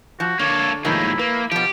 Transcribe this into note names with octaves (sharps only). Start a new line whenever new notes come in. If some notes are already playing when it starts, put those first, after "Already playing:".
F3 F#4
D3 A#3 A4 C#5
D#2 A2 D#3 F3 G#3 E4
A#3 B4
B2 F3 G4